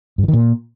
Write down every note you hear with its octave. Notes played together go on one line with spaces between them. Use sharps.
G2
E3
D#3
A#2